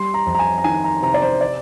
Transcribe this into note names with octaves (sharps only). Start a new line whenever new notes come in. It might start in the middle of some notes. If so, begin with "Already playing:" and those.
Already playing: G3 C6
A#5
F2
A#5
G#5
A#5
D#3 G#5
A#5
C3 A#5
D5
C5
D5